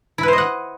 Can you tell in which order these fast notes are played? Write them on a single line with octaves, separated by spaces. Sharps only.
E4 B4 C5 D#5 F#5